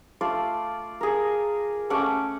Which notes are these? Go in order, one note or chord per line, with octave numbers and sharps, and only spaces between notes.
A3 F4 D5
G#4 A#4
A3 C#4 F#5 D6